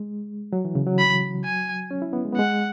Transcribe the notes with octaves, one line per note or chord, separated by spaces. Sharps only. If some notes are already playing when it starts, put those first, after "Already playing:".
Already playing: G#3
F#3
E3
C#3
F#3
B5
G#5
C#4
E4
B3
G#3
B3
G#3 F#5